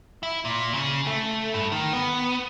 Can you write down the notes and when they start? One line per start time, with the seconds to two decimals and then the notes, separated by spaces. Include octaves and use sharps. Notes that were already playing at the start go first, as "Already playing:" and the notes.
0.23 E4
0.45 A#2
0.74 C#3
1.07 A3
1.54 G2
1.72 D#3
1.93 B3